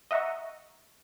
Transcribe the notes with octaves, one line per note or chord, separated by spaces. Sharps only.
D#5 E5 F#5 A#5 C#6